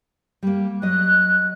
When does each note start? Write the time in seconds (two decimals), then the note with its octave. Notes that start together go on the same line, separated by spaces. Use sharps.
0.43 G3 A#3
0.82 F#3 D#5 F#6